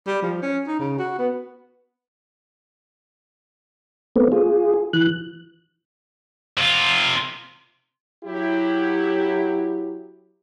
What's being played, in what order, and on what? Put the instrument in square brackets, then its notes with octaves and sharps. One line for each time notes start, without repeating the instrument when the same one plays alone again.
[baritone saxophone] G3
F3
C#4
D#4
C#3
F#4
B3
[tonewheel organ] A3 B3 C4
F4 G#4
E3 F#6
[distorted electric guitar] C3 F4
[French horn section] F#3 E4 G4